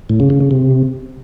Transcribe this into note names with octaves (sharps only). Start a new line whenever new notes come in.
A2
C#3
C#3
C#3
C3